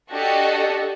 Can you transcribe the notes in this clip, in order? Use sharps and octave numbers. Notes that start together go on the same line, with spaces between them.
D4 F#4 G4 A4 D#5